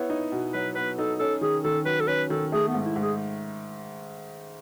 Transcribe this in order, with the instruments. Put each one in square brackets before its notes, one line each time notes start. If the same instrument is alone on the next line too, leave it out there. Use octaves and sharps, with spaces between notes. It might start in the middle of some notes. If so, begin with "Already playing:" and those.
Already playing: [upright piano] B3 E4 [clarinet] C#5
[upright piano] D#4
B2
[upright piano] F#3 [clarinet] B4
[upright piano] B3 [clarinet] B4
[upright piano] D#4 [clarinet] A4
[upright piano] C#4 [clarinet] A4
[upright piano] D#3 [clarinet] G#4
[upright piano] D#3 [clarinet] A4
[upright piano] F#3 [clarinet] B4
[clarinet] A4
[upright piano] C#4 [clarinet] B4
[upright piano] D#3 [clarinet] A4
[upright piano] A3 [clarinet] G#4
[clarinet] B3
[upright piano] G#2
[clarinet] E4
[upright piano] G#2
[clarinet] G#4